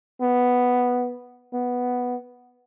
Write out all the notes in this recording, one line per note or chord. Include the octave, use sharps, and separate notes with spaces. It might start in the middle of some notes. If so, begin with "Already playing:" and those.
B3
B3